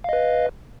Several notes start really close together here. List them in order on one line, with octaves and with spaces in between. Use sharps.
F5 D#5 B4